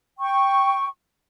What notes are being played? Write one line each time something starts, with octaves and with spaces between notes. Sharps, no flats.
G5 C#6